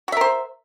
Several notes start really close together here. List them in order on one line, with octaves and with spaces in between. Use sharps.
F#4 E5 A#4 C5